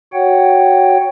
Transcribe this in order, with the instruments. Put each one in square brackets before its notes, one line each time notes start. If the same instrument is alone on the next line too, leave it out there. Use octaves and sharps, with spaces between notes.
[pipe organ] F#4 C#5 F#5 G5